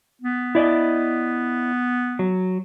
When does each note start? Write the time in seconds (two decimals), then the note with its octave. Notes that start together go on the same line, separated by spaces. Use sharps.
0.22 B3
0.55 E4 D5 D#5
2.19 F#3